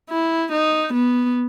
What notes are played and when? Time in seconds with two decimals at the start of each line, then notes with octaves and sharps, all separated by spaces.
0.10 E4
0.52 D#4
0.93 B3